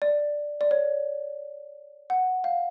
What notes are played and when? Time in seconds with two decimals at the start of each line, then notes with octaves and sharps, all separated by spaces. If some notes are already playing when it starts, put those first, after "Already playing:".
0.02 D5
0.61 D5
0.71 C#5
2.10 F#5
2.44 F5